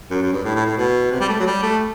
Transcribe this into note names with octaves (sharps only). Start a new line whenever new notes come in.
F#2
F#2
G2
A2
A2
A2
B2
C3
G3
A3
F#3
G3
A3